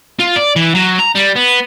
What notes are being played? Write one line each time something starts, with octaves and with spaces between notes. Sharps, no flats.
F4
D5
E3
F#3
A#5
G3
B3